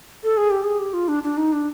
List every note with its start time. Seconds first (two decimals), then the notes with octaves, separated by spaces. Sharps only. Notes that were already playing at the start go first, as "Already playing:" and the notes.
0.24 A4
0.37 G#4
0.51 G4
0.64 G#4
0.79 G4
0.94 F4
1.08 D4
1.23 D4
1.37 D#4
1.53 D4